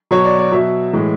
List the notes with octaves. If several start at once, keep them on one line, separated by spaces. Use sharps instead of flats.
B2 F#3 C#5
D5
D5
B2 F#3 E5
A2 E3 G#3